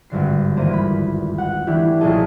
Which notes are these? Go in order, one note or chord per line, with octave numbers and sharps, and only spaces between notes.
G#1 G2 D3 C7
D#1 E3 A#3 C5 D#7
B5
F#5
E3 A3 D4 E4 G4
B1 A#2 F3 G#4 D#5 A5